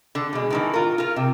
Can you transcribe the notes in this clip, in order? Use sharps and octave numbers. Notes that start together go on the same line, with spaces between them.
D3
B2 G#3
A2 D#3 E3
F4 A#4
F4 A#4
C3